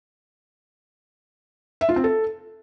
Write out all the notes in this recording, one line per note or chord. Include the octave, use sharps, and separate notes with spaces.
E5
F4
C4
A4